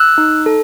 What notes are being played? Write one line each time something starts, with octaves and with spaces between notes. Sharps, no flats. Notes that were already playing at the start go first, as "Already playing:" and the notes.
Already playing: E6 F#6
D#4
A4